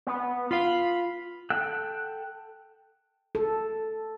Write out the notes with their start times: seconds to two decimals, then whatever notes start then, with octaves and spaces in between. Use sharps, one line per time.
0.07 B3
0.51 F4 F5 B5
1.50 A4 F#5 G5 E6 F#6
3.35 A4